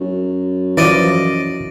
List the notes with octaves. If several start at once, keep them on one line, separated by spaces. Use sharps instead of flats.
F#2
E3 F3 D5 D#5